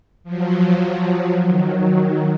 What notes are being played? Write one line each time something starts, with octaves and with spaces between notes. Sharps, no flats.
F3 F#3
D#3 F#3